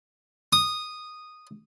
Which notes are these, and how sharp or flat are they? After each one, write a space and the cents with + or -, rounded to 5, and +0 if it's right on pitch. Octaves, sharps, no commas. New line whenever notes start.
D#6 -10